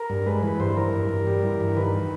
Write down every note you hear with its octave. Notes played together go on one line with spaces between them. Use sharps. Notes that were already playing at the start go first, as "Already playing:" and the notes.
Already playing: A#4
G2
G#3 B4
E3 B4
G2 C5
E3 A#4
G2
G2
G3
E3
G2
D#3 B4